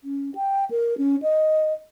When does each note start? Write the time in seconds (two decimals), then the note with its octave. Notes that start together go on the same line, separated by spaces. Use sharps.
0.04 C#4
0.35 G5
0.71 A#4
0.98 C#4
1.22 D#5